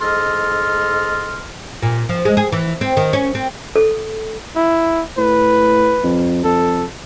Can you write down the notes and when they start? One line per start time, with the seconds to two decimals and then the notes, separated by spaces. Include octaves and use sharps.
0.02 G#2 A4 D#5 C6 F6
1.82 A#2
2.09 F3
2.25 G#3
2.37 G#4
2.52 E3
2.81 C4
2.97 D#3
3.13 C#4
3.35 C4
3.76 A4
4.56 E4
5.18 A2 B4
6.04 F2
6.44 F2 A4